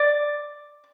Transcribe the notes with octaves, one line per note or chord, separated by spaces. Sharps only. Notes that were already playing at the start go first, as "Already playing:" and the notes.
Already playing: D5